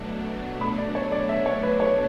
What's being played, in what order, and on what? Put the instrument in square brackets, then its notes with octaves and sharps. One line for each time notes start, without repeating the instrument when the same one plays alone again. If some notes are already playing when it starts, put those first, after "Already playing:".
Already playing: [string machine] B2 F#3 A3 D4
[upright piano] B5
D5
C#5
D5
E5
C#5
B4
C#5